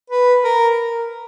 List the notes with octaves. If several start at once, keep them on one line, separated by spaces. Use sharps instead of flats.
B4
A#4